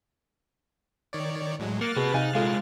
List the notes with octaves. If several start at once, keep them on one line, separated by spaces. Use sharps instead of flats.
D#3 C#5 D5
A2 F#3 G#3
A#3 F6 F#6 A6 C#7
C3 F#4 G#4 B4
C3 D#4 F5 G#5
A#2 G#3 F4 A4 F5